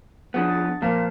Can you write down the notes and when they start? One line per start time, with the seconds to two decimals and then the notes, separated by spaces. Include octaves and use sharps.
0.34 F3 B3 D4 G#4 F#5
0.50 A6
0.82 A#2 F3 A#3 C5 F5 A5 F6